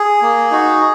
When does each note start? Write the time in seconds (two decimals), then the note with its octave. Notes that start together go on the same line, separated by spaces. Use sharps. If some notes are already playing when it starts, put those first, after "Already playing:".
Already playing: G#4
0.22 A#3
0.51 D#4 F#4